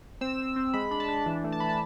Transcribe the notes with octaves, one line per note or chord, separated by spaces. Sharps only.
C4 E6
C4
C4
G#3 B5
D4 B5
A5
D4
E3
A3
A5
E3 B5
A5